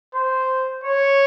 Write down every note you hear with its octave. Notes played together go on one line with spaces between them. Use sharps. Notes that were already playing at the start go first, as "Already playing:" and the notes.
C5
C#5